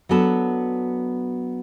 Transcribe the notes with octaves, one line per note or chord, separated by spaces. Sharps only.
F#3 B3 D4 F#4 A4